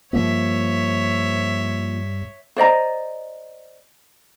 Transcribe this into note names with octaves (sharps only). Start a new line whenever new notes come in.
G2 F3 A#3 C#5 E5
C5 D5 D#5 A#5